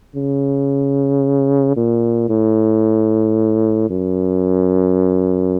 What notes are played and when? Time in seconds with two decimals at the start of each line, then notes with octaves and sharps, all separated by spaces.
0.15 C#3
1.76 A#2
2.29 A2
3.90 F#2